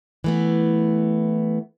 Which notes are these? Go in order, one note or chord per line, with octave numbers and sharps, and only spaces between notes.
E3 A3 B3